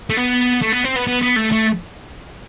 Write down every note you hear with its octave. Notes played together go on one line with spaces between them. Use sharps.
A3
B3
A3
B3
C4
B3
B3
B3
A3
A3